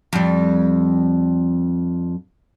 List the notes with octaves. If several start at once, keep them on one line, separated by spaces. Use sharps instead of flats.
F2 G3